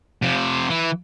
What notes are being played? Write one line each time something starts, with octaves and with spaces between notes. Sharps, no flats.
C3 F3
E3